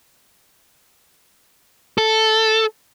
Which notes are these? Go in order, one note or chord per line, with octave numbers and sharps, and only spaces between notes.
A4